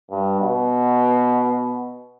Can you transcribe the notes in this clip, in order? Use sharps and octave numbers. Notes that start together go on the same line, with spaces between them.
G2
B2